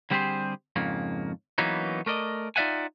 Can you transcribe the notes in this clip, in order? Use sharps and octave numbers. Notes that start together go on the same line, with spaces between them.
D3 G3 C4 G4 G#4 C5
F2 G#2 C#3 A#3
E3 F#3 A#3 B3 C#4 D#4
A3 A#4 D5 D#5
D#4 F4 D5 E5 F#5 G#5